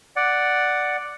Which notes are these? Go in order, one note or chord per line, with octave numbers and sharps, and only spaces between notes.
D5 F#5